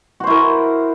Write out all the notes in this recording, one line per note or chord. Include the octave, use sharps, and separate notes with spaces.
E4 F#4 A#4 C5